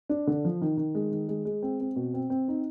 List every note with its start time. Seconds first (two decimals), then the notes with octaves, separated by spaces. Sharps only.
0.09 D4
0.27 D3
0.45 F3
0.61 D#3
0.77 D#3
0.95 G#3
1.11 D#3
1.29 G#3
1.45 G#3
1.62 C4
1.80 C4
1.96 B2
2.14 C4
2.30 C4
2.48 D#4